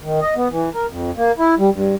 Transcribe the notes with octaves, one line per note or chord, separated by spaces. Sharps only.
D#3
D#5
B3
E3
A#4
F2
A#3
E4
G3
G2